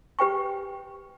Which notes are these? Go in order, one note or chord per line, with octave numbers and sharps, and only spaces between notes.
G4 B4 G5 C#6